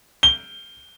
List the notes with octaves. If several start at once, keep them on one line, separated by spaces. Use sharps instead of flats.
G7